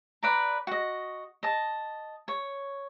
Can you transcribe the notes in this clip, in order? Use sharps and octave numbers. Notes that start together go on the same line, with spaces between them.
B4 D5 A#5
F#4 D#5
D#5 A5
C#5